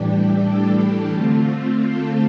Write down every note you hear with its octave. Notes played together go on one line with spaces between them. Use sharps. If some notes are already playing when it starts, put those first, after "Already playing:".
Already playing: A2 E3 G3 D4 G4
A4
D3 A3 C4 F4
F4
A4